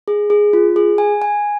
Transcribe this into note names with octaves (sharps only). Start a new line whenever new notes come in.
G#4
G#4
F4
G#4
G#5
G#5